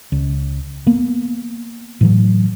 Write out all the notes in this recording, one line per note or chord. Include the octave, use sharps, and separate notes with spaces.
C#2
A#3 B3
A2 E3 F#3